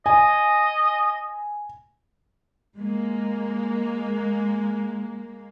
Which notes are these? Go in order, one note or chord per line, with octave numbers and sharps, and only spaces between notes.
D#5 G#5
G#3 A#3